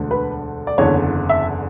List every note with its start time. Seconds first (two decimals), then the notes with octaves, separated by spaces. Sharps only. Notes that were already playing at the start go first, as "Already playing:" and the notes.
Already playing: E1 D2 D3
0.11 B4
0.67 D5
0.78 F#1 E2 D3 C#5
1.29 E5